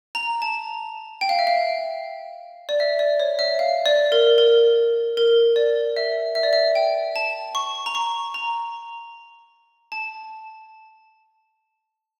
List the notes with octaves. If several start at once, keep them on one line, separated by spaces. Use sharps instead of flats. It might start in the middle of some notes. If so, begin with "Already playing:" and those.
A#5
A5
G5
F5
E5
F5
D5
E5
D5
C#5
E5
F5
D5
A#4
A#4
A#4
D5
E5
E5
D5
E5
G5
A5
C#6
A#5
C#6
A#5
A5